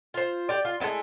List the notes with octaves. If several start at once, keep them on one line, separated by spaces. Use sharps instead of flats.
F4 C5
G4 D5
F4
G#3 A3 B3 E4